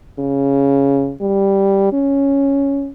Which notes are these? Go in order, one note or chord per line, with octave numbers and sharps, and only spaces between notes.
C#3
G3
C#4